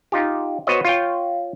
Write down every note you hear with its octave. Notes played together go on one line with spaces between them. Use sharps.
D#4 F4 G4
B3 F#4 C5 C#5 D#5
F4 C#5 G5